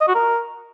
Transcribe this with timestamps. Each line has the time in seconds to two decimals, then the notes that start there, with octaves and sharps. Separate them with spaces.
0.01 D#5
0.08 F#4
0.15 A#4